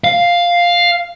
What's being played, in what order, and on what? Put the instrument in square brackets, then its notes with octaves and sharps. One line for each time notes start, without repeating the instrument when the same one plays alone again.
[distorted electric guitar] F5